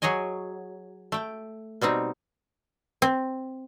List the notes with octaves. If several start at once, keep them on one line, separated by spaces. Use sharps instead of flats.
F#3 G#4 C#5 D#5 G#5
A3 G5
B2 G3 C4 D#4
C4